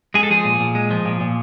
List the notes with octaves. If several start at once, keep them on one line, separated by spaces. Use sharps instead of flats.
G#3 G#4
A4
F3 G#4
A#2
A#2
G#3
F3
A#2
A#2